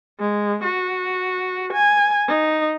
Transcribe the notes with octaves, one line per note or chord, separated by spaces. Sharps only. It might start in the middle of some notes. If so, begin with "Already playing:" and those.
G#3
F#4
G#5
D#4